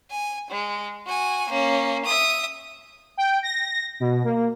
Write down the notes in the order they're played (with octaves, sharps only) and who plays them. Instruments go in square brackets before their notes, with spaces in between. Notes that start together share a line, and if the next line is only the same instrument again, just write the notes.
[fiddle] G#5
G#3
F#4 G#5
A#3 C#4
E5 D#6
[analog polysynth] G5
A#6
B2
A#3